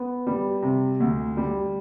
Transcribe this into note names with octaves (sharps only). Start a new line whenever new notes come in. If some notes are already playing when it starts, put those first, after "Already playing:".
Already playing: B3
G3
C3
D2
G3